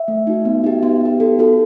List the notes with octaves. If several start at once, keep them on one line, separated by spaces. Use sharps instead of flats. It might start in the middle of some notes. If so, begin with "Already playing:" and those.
Already playing: E5
A3
D#4 F#4
B3
D#4 G4
B3
D#4 G4
B3 A4
D#4 F#4 A4